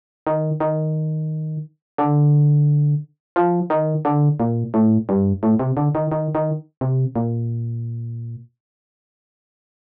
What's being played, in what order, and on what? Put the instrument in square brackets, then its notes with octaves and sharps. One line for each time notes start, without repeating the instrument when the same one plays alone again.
[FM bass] D#3
D#3
D3
F3
D#3
D3
A#2
A2
G2
A2
C3
D3
D#3
D#3
D#3
C3
A#2